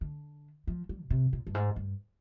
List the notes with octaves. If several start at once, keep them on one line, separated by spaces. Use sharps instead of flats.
D3
F3
G3
A#2
C3
A#2
G2
G#2
G2